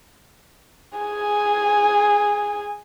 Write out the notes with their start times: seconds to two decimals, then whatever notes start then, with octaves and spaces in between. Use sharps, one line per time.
0.98 G#4 G#5